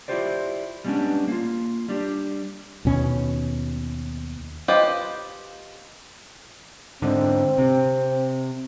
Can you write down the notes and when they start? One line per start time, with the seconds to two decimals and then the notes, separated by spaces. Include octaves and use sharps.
0.08 E4 F4 G4 C5 D5
0.85 G3 G#3 A#3 B3 C#4 D4
1.28 A#3 F4
1.89 G3 D4 G4
2.85 D#2 B2 C#4
4.68 F4 G4 B4 C5 D#5
7.02 G#2 D3 C4
7.58 C3